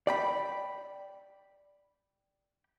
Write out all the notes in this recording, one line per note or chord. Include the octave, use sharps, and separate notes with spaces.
D5 G5 B5